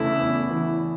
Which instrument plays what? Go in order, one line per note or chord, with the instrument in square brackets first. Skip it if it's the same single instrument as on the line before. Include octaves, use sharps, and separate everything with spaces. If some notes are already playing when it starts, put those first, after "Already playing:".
Already playing: [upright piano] E2 C#3 E3 A3 [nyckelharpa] E4
[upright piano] E2
E3